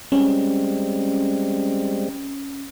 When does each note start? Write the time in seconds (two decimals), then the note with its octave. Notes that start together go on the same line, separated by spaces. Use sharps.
0.12 G3 G#3 C4 C#4